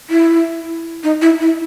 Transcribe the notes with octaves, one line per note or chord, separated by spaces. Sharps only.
E4
D#4
E4
E4